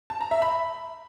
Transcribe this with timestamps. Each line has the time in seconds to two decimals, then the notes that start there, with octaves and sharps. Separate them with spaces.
0.10 A5
0.21 A#5
0.31 E5
0.42 B5